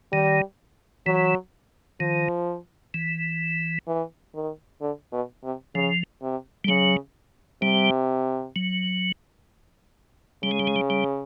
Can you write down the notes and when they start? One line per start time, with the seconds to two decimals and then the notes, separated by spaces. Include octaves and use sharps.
0.12 D#3 G3
1.06 E3 F#3
2.00 D#3 F3
2.94 E3
3.87 E3
4.35 D#3
4.81 D3
5.12 B2
5.44 C3
5.75 C#3 F3
6.22 C3
6.64 G3
6.68 C#3 F#3
7.62 C3 G3
8.56 F#3
10.43 C#3 G3
10.51 G#3
10.60 G3
10.67 G#3
10.76 G3
10.90 G3